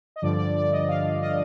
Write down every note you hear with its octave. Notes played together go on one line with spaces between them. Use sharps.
D#5
G2 D3 F3 D5
D5
D5
D#5
F5
D#5